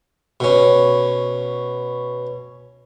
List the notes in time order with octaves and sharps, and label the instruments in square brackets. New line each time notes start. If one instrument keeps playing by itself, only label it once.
[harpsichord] B2 C#4